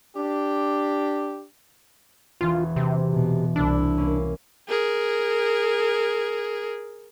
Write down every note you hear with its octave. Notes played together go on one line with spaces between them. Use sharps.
D4 G4
E1 E3 F4
C3
B2
C2 D4 E4
A#3 C#4
G#4 A#4